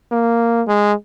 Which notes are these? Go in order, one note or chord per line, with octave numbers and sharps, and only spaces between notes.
A#3
G#3